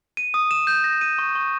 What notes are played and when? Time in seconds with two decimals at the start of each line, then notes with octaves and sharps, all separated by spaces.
0.17 D#7
0.34 D#6
0.51 E7
0.67 G6
0.84 A#6
1.01 D#7
1.19 C#6
1.35 C#6